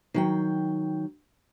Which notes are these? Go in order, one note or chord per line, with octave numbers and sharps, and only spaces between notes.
D#3 F#3 G5